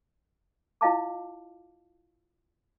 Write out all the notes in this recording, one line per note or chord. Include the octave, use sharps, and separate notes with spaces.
E4 F4 D#5 F5 A5 D6